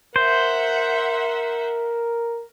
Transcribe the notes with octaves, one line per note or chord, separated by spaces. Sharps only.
A#4 C5 E5 F#5